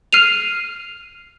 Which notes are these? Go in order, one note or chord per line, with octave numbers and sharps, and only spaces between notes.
F6 C7 D#7 F7